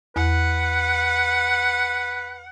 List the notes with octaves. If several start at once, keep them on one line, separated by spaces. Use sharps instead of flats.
E2 B4 F#5